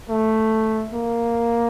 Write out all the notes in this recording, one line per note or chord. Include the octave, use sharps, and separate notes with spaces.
A3
A#3